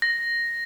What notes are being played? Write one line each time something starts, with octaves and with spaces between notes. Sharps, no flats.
A#6